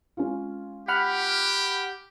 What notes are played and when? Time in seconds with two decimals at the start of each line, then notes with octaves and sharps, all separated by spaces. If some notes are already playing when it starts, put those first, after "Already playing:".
0.17 G#3 C#4 F4
0.88 G4 F#5 B5 F6